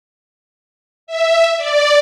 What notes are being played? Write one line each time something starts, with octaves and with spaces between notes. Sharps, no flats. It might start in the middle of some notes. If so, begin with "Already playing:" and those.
E5
D5